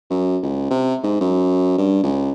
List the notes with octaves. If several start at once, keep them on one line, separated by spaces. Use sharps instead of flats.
F#2
C#2
C3
G#2
F#2
G2
C#2